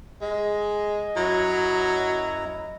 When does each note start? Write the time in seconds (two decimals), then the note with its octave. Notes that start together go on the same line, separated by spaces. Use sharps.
0.21 G#3 D#5
1.16 F#2 F#3 E4 A#5